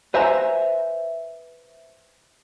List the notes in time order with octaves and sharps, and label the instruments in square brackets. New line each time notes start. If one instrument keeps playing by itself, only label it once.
[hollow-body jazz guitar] B4 C5 E5 G#5 A#5